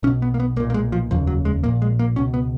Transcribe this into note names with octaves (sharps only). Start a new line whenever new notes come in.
B1 B2 C#4
B3
A#3
B3
B1 A#2 A#3
A#3
G#3
F3
F1 D#2 C#3 F3
F#3
G#3
A#1 A#2 A#3
G#3
A#3
C#2 B2 C#4
B3